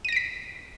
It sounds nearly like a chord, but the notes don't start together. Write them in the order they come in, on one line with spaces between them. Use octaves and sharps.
D#7 A#6 D7 B6